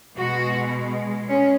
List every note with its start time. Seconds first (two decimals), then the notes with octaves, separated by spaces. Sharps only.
0.17 B2 G#3 F#4
1.28 G#3 C#4